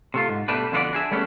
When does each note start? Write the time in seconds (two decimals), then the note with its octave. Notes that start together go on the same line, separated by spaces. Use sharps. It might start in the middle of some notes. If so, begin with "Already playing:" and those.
0.14 C3 A3 F4
0.29 G#2
0.48 B2 G3 A3 D4 B4
0.72 F2 D3 B3 F4 F#4 D5
0.93 D4 G#4 E5
1.11 G3 A3 B3 C#4 F4 G4